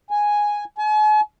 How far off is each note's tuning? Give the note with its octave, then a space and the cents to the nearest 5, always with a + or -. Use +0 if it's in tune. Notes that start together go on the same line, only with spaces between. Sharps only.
G#5 +0
G#5 +45